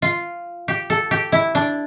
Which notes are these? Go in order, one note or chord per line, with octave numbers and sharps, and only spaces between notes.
F4
G4
A4
G4
E4
D4